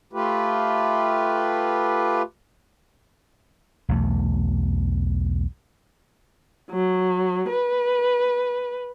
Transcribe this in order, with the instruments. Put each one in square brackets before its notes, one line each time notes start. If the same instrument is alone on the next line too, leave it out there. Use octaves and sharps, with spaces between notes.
[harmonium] A3 F4 G4 B4
[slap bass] B1 E2 A3
[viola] F#3
B4